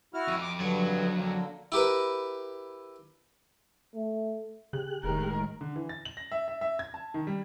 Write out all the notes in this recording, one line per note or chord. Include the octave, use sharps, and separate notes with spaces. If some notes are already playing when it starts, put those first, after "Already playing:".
E4 F#4 F6
F2
D6
G2 D3 F#3
D3 A#3
E4 G4 A#4 B4
A3
C#3 G4 G#4 F#6
F1 A2 D#3 G#3 A#4
D3
E3
A6
F#7
A#6
E5
E5
E5
G#6
A5
D#3
G3